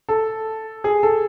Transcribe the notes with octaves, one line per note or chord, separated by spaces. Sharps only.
A4
G#4
A4